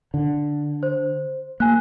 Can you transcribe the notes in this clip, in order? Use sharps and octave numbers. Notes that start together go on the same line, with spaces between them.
D3
C5
A#3 G#5 F#6